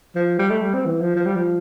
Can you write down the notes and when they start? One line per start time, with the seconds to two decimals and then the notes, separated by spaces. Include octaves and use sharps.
0.15 F3
0.39 G3
0.50 A3
0.62 G3
0.74 C4
0.86 E3
1.01 F3
1.16 F3
1.26 G3
1.36 F3